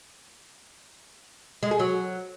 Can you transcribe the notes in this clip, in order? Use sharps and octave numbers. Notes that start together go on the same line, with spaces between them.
G#3
G#4
F#3